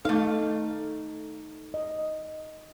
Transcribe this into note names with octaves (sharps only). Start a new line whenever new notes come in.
A3 D#4 A4 F5
D#5